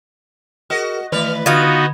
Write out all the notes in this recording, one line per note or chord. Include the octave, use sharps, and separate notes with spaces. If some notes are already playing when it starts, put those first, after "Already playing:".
F#4 G#4 A#4 D#5 F6
D#3 E3 A3 B4 D5 F6
D3 B3 D#4 F4 F#4 F5 B5 G#6